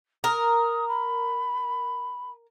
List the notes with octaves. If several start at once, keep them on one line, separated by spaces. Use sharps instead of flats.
A#4 D#6
B5